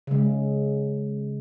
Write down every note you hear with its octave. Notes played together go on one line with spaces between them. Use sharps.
C#3 G#3